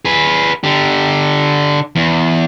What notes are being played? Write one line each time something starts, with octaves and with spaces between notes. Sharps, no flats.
G#4 B4
D3 G4
E2